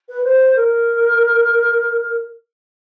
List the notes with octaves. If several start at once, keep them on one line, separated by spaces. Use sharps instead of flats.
B4
C5
A#4